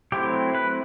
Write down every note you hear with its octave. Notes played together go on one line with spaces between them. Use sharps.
F#3 A3 C4 E4 G4
B4